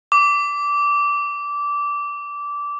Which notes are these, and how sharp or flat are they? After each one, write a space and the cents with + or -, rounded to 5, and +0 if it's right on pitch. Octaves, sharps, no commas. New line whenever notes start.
D6 -15